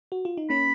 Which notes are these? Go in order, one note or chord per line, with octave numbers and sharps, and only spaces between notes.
F#4
F4
D#4
A#3 C#4 B5